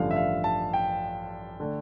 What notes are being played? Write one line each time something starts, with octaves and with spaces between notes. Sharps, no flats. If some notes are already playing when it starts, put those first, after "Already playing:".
Already playing: A1 G2 D3 F3 F5
E5
F5
A5
G5
D3 A3